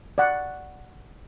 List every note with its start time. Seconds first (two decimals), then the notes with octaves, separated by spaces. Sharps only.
0.18 D5 F#5